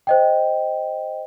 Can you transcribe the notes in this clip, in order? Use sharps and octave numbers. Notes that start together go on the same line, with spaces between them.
C5 D#5 G5